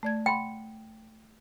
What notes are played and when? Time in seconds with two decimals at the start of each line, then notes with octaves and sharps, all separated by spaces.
0.03 A3 D5 G#6
0.26 F#5 G5 B5 C6